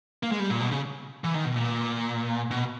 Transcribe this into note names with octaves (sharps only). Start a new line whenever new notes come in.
A#3
G#3
G3
A#2
B2
C#3
E3
D#3
B2
A#2
B2